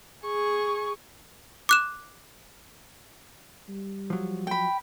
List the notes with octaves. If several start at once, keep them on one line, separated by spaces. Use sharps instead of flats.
G#4 C#6
D6 F#6 E7
G3
F3 F#3
G5 B5